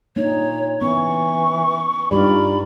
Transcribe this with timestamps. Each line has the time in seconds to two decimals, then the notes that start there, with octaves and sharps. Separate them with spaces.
0.16 A#2 A#3 D4 D#4 C#5
0.81 E3 B3 C#4 C#6
2.11 G2 D#4 F4 G4 D5 B5